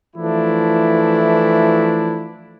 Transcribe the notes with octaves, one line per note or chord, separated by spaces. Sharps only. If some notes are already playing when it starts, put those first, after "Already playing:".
E3 F3 A3 D4 E4